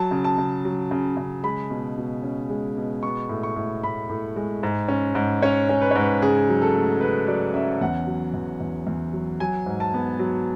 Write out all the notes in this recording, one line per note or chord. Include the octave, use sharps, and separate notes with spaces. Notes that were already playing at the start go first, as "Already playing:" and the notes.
Already playing: F#3 A5
C#3
A5
C#3
F#3
C#3
C#3
G#3 B5
B2
B2
C#4
G#3
B2
B3 C#6
A2
C#6
A2
A2 B5
A2
G#3
G#2
C#4
G#2
C#4 C#5
C#4
B4
C#5
G#2
B4
C#3 G#4
F#3
A4
A3
C#3 B4
F#3 D5
C#4 E5
E2 F#5
F#3
E2
E2
E2
F#3
F#3 G#5
G#2
A5
B3
F#3